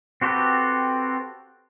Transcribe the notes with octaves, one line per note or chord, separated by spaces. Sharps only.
C4 F#4 G4 A4 B4